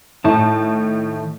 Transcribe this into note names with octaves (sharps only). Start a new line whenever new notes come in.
A2 D#3 A3 A5